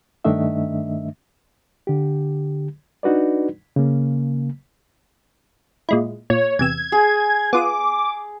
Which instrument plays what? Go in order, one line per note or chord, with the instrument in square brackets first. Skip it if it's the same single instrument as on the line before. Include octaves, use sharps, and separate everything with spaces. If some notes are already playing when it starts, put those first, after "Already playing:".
[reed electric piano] G2 D#3 A3 D4 D#5 E5
D3 G4
D4 D#4 F#4 B4 D5
C#3 A#3
[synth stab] A#2 G#3 E4
[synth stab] A#2 [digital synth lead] C#5
[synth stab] E2 C3 E6 [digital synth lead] G#6
[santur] G#4
[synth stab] B3 F4 D#6 [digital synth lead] D6